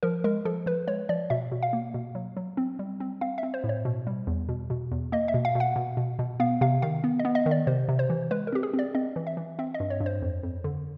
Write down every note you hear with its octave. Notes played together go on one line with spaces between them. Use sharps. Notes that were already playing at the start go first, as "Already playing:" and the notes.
F3 A#4
G#3 A#4
F3 A4
F3 B4
G#3 C#5
F3 D5
B2 E5
B2
F5
A#3
B2
F#3
F#3
C4
G3
C4
C4 F5
E5
C4
C5
A2
C#5
B2
G3
E2
B2
B2
E2
A#3 D#5
E5
B2
F5
B2
F#5
B2
B2
B2
B3 F5
C3 F5
D#3 F5
B3
D#5
B3
D#5
D#3
D5
C3 C5
C3
C5
E3
G#3 B4
A#4
C4 G4
G#4
C4
D5
C4 D#5
E3
E5
E3
C4 E5
D#5
G2
C#5
G2
C5
F2
F2
D3